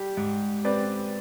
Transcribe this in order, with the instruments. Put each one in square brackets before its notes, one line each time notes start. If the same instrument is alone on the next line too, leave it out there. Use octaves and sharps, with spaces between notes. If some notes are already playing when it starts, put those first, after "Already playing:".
Already playing: [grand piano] G3 [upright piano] G4
[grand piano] G#2
[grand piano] C4 [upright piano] B4 D5